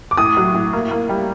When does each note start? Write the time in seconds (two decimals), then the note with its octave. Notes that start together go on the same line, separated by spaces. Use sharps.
0.11 D6
0.17 A2 D#6
0.37 F#3
0.54 A2
0.73 A#3
0.91 A#3
1.09 G3